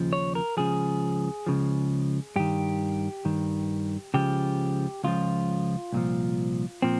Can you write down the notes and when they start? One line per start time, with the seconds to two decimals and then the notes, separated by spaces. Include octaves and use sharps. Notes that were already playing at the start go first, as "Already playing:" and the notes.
Already playing: D#2 C#3 F3
0.13 C#5
0.35 A#4
0.57 C#2 C#3 F3 G#4
1.47 C#2 C#3 F3
2.36 G2 D#3 G4
3.25 G2 D#3
4.14 C#2 C#3 F3 G4
5.04 C#2 C#3 F3 F4
5.93 C2 A#2 F3
6.82 A#2 F3 C4